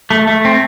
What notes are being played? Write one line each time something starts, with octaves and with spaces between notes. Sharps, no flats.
A3
A3
C4